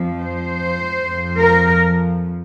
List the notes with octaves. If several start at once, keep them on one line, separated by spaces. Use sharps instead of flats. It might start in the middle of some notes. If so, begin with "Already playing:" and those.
Already playing: F2 F3
C5
F2 F3
A#4